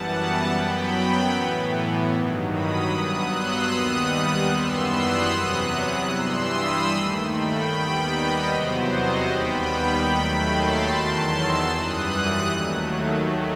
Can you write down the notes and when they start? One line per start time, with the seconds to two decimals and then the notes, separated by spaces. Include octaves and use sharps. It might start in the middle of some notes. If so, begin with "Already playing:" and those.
Already playing: F#2 E3 G3 B3 F#5 A5
0.53 F#2 F#3 B3 G5 B5
1.33 A2 E3 B3
2.13 G2 D#3 F#3
2.52 B5 D#6
2.92 G2 F#3 B3 D#6 F#6
3.32 C6 E6
3.71 D#2 D#3 G3 B3 D#6 F#6
4.52 F#2 E3 G3 B3 C6 E6
4.91 D#6 F#6
5.31 E2 C3 F#3 B3
6.10 G2 E3 G3 C6 E6
6.50 B5 D#6
6.90 D#2 D#3 A3
7.30 G5 B5
7.70 D#2 D#3 G3 B3
8.10 D#5
8.49 E2 C3 F#3 B3 C5
8.90 D#5
9.29 D#2 D#3 G3 B3 G5 B5
10.09 D#2 D#3 F#3 A3
10.49 A5 C6
10.88 E2 D#3 F#3
11.28 C6 E6
11.68 F#2 E3 G3 D#6 F#6
12.48 D#2 D#3 F#3 A3